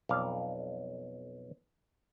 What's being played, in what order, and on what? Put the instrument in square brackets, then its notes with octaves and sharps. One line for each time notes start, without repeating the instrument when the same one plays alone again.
[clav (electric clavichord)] B1 F2 D5 F5